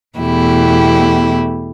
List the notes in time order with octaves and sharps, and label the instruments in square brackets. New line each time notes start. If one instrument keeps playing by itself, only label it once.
[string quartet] E2 B2 A3 E4 G4